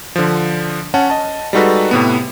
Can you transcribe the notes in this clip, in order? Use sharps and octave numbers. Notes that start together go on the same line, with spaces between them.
D3 F3
C#4 F#5 A5
D#5 A5
G3 G#3 D#4 F#4 A4 B4
A2 C3 B3